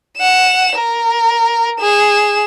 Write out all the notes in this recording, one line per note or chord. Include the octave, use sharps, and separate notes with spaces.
F#5 E7
A#4
G#4 E7